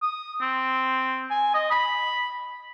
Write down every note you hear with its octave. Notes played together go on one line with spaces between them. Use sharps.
D#6
C4
G#5
D#5
B5